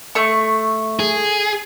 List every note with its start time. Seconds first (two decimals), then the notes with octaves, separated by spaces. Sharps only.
0.15 A3 C#6
1.00 G#4